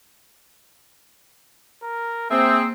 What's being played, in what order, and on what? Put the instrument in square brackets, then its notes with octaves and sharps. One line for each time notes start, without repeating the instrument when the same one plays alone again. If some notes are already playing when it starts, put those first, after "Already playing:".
[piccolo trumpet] A#4
[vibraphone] A#3 E6 [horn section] C4 [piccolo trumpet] G#4 [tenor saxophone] E5